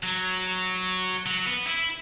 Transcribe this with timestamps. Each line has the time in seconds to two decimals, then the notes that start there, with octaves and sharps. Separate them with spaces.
0.03 F#3
1.26 F#3
1.47 B3
1.67 E4